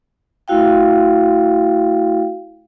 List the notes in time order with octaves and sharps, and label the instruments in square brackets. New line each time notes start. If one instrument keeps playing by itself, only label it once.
[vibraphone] A3 E4 F#4 F5 G5